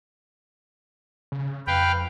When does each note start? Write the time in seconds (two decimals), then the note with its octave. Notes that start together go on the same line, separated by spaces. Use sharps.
1.32 C#3
1.67 F2 B4 F5 G5